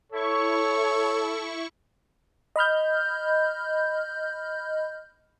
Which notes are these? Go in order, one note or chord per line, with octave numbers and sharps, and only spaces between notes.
E4 A4 C#5 C#6
D#5 B5 F6 G6